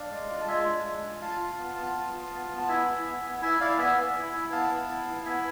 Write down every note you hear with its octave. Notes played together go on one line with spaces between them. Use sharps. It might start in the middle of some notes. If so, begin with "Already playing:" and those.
Already playing: D4 D5 F5
G#3
F4
A5
G#3 E5 G#5
D4
G#3
F4
F4 F5 A5
F4
B3
B3
F4
F4
B3
B3
A5
E4 E5 G#5
E4
B3
B3
E4 E5 G#5
E4 D5 F5
B3 E5 G#5
B3
E4
E4
B3 F5 A5
B3
E4
E4
B3 E5 G#5